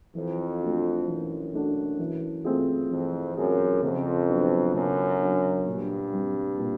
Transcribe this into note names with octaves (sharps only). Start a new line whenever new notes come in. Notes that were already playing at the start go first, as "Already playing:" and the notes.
F2 E3
A3 D4 F#4
F#2 E3
A3 D4 F#4
E3
A3 C4 F4 G#4
F2 E3
F#2 A3 C4 F4 G#4
F2 C#3
F#3 B3 D4
F#2 C#3
F#3 B3 D4
G2 A#2
G3 C4
A#2